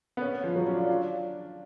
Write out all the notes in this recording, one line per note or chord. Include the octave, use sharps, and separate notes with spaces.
B3
C#4
F3
F#3
C#4
D4
F4
D4